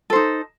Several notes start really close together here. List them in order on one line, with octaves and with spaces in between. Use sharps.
A4 C5 D#4